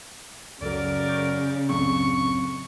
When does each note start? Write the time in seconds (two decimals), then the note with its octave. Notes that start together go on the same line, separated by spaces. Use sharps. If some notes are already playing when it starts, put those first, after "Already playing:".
0.61 C#2 F#2 C#3 F#3 A#4 D5
1.09 C#6 D6 G6
1.69 C#2 F#2 A2 F#3 C4 C#6